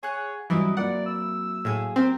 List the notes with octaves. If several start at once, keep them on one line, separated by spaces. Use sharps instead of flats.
G#4 C#5 F#5 F#6
G2 E3 F#3 C4 E4 B4 D#5
F#3 A#3 D5 F#5
E6
A2 G#4 F5
C4 G4 A#4